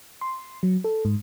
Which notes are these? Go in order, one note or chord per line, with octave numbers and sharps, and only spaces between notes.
C6
F#3
A4
G#2